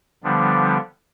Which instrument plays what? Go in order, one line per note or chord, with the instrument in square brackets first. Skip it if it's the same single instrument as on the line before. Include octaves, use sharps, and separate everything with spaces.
[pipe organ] D3 F3 G3 B3 D4